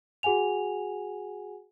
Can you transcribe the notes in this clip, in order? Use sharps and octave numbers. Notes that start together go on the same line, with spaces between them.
F#4 G#4 F#5 G#5 F7